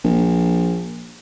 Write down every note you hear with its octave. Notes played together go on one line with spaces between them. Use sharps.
A#1